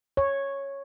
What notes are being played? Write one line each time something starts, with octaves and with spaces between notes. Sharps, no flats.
C#5